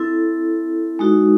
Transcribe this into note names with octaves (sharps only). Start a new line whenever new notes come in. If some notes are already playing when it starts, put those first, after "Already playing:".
Already playing: C4 E4 A4
G#3 D#4 F#4